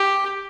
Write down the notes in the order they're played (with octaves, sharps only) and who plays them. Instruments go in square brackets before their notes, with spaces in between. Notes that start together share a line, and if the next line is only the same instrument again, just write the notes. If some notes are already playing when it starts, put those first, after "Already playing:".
Already playing: [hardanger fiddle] G4